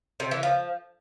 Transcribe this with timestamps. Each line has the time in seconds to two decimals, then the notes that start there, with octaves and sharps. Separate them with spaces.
0.20 C3
0.31 E3
0.43 F3